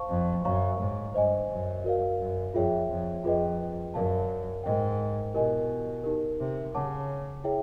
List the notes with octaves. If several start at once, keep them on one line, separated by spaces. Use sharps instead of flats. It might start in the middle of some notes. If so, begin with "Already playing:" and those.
Already playing: C5 F5 A5 C#6
F2
F#2 C#5 F5 A#5 C#6
G#2
G2 C5 D#5 G#5
F#2
F#4 A#4 D5 F5
F#2
F2 F4 G#4 C#5 E5 G5
F2
F2 F4 G#4 B4 D#5 G5
F#2 A#4 D5 F5 A5
G#2 A#4 D#5 G5
B2 E4 G4 A#4 D#5 G#5
D#4 G4 A#4
C3
C#3 C#5 F#5 A5 D6
E4 G#4 C#5 E5 G5